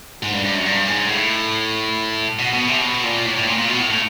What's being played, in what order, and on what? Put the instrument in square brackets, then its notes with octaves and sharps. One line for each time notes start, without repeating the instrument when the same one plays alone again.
[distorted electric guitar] G#2
G2
G2
F#2
G2
G#2
A2
B2
B2
C3
B2
A#2
A2
A2
A#2
A#2
B2
A2
A2